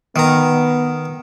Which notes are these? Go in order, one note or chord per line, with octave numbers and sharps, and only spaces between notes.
D#3 B3 A#5